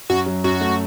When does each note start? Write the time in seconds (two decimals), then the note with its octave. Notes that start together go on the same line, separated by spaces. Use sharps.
0.10 F#2 F#4
0.26 F#3
0.44 F#2 F#4
0.61 A3